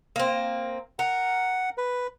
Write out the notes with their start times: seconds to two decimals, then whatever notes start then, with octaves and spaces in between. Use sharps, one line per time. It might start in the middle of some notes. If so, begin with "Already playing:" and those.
0.16 A#3 C4
0.99 A#4 F#5
1.78 B4